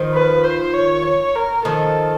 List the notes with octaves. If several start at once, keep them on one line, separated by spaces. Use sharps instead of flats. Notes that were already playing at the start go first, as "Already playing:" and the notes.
Already playing: D#3 F3
B4
C5
C#5
C#5
A#4
D#3 F3 A4